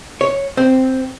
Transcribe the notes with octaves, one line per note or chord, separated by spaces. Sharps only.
C#5
C4